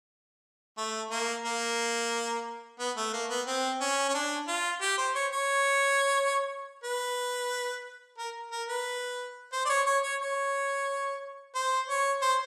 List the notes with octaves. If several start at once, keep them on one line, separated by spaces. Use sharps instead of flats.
A3
A#3
A#3
B3
A3
A#3
B3
C4
C#4
C#4
D4
F4
G4
C5
C#5
C#5
B4
A#4
A#4
B4
C5
D5
C#5
C#5
C#5
C#5
C5
C#5
C5